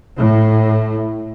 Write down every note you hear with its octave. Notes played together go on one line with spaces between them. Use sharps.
A2